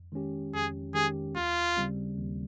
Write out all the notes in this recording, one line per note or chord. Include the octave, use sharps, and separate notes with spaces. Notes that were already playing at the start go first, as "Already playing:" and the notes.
Already playing: F2
D#3 G#3 C#4 G4
F2 G#4
D#3 G#3 C#4 G4 G#4
D#2 F4
C#3 G3 C4
D#2